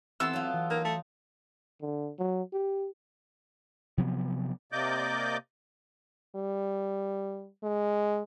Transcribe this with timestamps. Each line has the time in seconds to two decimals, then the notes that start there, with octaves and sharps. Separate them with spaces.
0.20 E3 B3 C4 A4 E5 C6 E6
0.33 F#3 F4
0.54 E3
0.70 A#3 D#4
0.84 A3
1.81 D3
2.19 F#3
2.53 G4
3.97 C3 F3 F#3 B3
4.72 C3 A#3 D5 D#5 D6 G6
6.36 G3
7.63 G#3